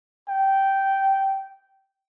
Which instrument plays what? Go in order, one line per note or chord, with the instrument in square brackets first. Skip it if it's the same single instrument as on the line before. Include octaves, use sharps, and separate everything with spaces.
[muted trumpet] G5